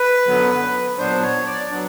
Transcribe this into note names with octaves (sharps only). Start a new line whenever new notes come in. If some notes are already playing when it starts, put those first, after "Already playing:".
Already playing: B4
F#2 D3 F#3 B3
A#2 F#3 B3 D4 C5
C#5
D5
F#3 B3 D4